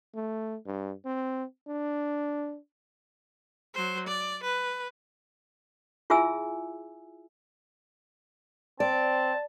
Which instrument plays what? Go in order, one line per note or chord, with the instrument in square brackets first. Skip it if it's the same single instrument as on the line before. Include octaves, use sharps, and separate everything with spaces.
[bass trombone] A3
G2
C4
D4
[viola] F#3 C5
D5
B4
[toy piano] E4 F4 G#4 E5 G#5 E6
[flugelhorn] C4 [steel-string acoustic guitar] D5 [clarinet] A5